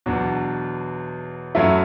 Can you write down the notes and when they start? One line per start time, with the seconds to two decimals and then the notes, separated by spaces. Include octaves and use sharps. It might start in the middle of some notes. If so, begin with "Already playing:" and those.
0.06 E2 B2 F#3 D4
1.55 F#2 F#3 A3 E4